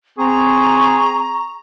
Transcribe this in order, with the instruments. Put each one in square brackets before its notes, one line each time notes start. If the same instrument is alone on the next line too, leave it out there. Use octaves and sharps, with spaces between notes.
[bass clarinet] C4 [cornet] G#4 [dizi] A#5 [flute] C#6